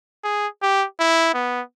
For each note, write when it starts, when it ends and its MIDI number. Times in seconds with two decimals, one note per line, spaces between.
0.24 0.47 68
0.63 0.86 67
1.00 1.33 64
1.34 1.62 59